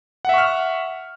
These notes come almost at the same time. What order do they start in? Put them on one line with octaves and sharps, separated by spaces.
F#5 E5 C#6 F6